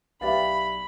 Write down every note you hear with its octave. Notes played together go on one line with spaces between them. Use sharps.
B1 G4 B4 D5 E5 F5 B5